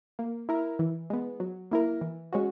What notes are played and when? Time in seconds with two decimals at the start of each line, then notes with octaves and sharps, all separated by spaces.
0.19 A#3
0.49 E4 A#4
0.79 E3
1.10 G#3 B3
1.40 F#3
1.71 A#3 E4 A#4
2.01 E3
2.33 G#3 C#4 F#4